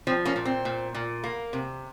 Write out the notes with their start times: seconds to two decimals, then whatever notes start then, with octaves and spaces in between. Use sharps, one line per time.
0.07 F3 C4
0.25 A#3 C#4
0.36 A#2
0.45 C4
0.65 A#2
0.95 A#2
1.24 A#3
1.53 C3